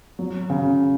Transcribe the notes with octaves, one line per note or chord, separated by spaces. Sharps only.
F#3
C#3